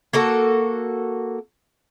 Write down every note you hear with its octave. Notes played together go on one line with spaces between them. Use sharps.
A#3 F#4 A4